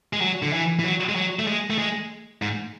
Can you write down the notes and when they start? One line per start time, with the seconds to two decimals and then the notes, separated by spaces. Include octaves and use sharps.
0.13 G#3
0.21 F#3
0.42 D3
0.53 E3
0.79 E3
0.84 F#3
1.09 G#3
1.16 F#3
1.39 A3
1.47 G#3
1.70 A3
1.78 G#3
2.42 G#2